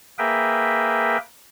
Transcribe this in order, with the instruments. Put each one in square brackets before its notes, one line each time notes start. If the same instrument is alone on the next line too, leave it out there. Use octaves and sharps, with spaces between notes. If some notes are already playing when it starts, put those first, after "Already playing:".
[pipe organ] A#3 G#4 A#4 B4 E5 G5